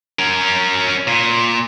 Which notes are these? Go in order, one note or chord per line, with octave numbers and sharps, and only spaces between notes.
C#4 A#4
A#2